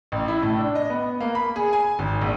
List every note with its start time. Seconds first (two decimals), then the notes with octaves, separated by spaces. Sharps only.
0.12 A1
0.28 E4
0.42 A2
0.58 D4
0.75 D#5
0.90 B3
1.20 A#3
1.35 B5
1.56 G#4
1.73 G#5
1.99 G#1
2.21 A#1